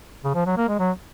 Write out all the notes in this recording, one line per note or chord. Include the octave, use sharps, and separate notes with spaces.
C#3
F3
F#3
A#3
G#3
F#3